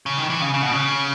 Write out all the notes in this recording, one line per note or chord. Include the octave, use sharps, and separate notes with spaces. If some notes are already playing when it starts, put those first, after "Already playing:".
C#3
D#3
E3
C#3
C#3
B2
C#3